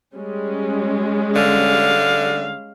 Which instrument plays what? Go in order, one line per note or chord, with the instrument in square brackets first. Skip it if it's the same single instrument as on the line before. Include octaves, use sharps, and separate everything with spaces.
[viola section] G3 G#3 C#4
[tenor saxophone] D3 [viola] F5